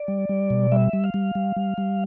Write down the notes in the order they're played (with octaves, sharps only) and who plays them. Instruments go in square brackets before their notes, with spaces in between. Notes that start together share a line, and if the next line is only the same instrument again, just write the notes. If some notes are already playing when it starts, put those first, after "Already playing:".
Already playing: [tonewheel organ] D5
G3
G3
B2
G3 E5
G3
F5
G3
G3
G3
G3